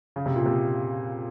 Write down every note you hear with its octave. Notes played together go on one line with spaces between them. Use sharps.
C#3
C3
A#2
C3